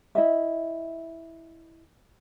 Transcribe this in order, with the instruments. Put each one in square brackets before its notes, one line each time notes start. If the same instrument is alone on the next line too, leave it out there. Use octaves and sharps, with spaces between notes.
[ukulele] E4 D#5 E5